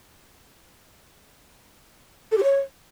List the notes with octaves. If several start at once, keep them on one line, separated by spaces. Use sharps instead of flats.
A4
G4
C#5